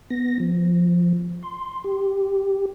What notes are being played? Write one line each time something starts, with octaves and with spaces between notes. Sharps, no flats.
B3 A#6
F3
C6
G4